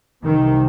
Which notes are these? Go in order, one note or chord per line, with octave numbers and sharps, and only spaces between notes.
C2 C3 D#3